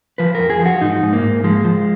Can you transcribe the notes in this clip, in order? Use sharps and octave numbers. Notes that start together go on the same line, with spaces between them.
F3 B4
F2 A#4
G#4
F3
F#4
G#2 D#4
G#2
A#3
G#2
F3 G#3
F3